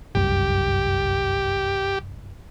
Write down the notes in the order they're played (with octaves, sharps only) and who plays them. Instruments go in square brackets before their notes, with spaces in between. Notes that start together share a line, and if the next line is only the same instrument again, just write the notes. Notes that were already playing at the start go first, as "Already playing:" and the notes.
[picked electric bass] G1 C2 F#2 [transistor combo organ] G4